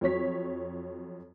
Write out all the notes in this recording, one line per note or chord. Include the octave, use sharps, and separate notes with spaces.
F2 F#3 C#5 B6